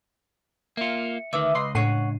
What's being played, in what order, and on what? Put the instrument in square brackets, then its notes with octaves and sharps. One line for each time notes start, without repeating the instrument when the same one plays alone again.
[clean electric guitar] A#3 F4 [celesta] E5 C#7
[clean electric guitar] D2 D#3 [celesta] B4 D6 E6 [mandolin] E5
[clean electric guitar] C#2 [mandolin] D#5 B5 C6
[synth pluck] A2 C7 D#7 [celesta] D4 [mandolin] C#5 F#5